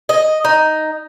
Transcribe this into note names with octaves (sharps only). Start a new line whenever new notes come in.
D#5
D#4